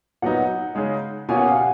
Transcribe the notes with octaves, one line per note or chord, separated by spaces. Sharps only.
A#2 F#3 B3 D#4 F#5
C#3 G#3 D#4
B2 A#3 C#4 F4 G#5
F#5
F5
F#5